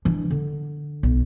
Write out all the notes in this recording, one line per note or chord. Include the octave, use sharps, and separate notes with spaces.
E3 D4
D3
B1